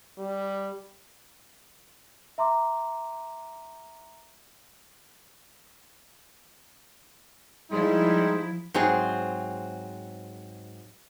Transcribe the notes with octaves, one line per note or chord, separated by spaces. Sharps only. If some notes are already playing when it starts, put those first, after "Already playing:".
G3
E5 A#5 C6 D6
F3 G3 G#3 D#4 E4
G#2 F#3 C4 G#4